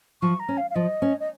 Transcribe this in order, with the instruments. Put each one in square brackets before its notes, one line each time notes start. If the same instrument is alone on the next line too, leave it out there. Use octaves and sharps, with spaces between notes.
[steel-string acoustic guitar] F3 [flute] C#6
[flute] A#5
[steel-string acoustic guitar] C#4
[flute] F5
F5
[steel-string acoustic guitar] F3 [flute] D#5
[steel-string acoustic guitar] C#4
[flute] D#5